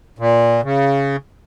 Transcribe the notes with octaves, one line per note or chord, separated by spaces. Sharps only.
A#2
C#3